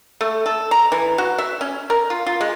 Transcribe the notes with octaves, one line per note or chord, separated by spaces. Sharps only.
A3
A4
A#5
E3
F#4
E5
C#4
A#4
F4
F4
G#3